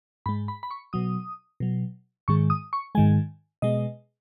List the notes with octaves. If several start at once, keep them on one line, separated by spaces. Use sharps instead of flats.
G#2 G#3 B5
B5
B5
C#6
B2 F#3 D#6
B2 F#3
G#2 D#3 G#3 C#6
D#6
C#6
G#2 D#3 G#3 G#5
B2 G#3 D#5